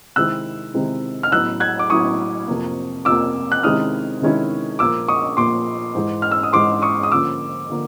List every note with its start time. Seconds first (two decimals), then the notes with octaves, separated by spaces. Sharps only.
0.16 C3 D#3 G#3 C4 E4 E6 F#6
0.74 C3 D#3 G#3 C4 E4
1.23 F6
1.32 A2 F#3 B3 E4 E6 F#6
1.60 F#6 G#6
1.79 D6
1.90 A2 F#3 B3 E4 C#6 D#6
2.48 F2 C3 F3 A#3
3.05 F2 C3 F3 A#3 D6 E6
3.52 F#6
3.63 C3 D#3 G#3 C#4 E4 D#6 F6
4.22 C3 D#3 G#3 C#4 E4
4.79 A#2 F3 A#3 D6 E6
5.08 C#6 D#6
5.37 A#2 F3 A#3 C6 D6
5.95 G#2 E3 G#3
6.22 F6
6.32 E6
6.43 D#6
6.53 G#2 E3 G#3 C6 D6
6.82 C#6 D#6
7.03 D#6
7.11 D3 F3 A#3 C#4 D6 E6
7.69 D3 F3 A#3